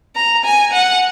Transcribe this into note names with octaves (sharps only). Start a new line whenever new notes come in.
A#5
G#5
F#5